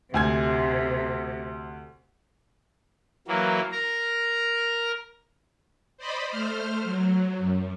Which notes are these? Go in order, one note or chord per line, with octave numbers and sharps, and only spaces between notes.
D2 C3 G#5 G#6
E3 F#3 A#3
A#4 A#5
C5 D5 D#5 B5
A3 C5 F6
F#3
F#2